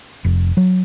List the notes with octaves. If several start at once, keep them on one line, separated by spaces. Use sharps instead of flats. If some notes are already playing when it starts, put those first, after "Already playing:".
F1
F#3